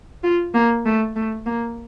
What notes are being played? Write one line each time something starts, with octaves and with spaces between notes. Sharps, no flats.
F4
A#3
A3
A3
A#3